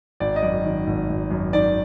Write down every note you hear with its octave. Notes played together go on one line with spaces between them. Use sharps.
G#1 D5
D#5
F#2 D5
D#3
G#1
G#1
F#2
D#3 D5